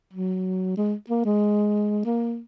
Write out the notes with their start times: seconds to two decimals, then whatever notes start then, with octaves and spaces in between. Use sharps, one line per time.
0.13 F#3
0.77 G#3
1.10 A#3
1.25 G#3
2.06 A#3